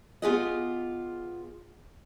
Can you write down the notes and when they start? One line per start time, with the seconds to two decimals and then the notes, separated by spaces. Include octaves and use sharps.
0.22 B3 F4 G4 G#4 B4 D#5